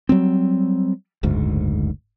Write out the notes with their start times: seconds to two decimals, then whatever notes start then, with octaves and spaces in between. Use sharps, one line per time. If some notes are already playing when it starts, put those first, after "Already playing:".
0.09 F#3 G3 C4
1.23 F#1 D2 G#2